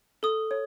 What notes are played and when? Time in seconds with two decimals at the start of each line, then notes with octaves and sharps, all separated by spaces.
0.23 A4 D#6
0.51 C#5